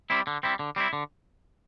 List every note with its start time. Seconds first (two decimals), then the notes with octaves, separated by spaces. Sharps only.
0.10 G3 C4 E4
0.27 D3
0.43 G3 C4 E4
0.59 D3
0.76 G3 C4 E4
0.93 D3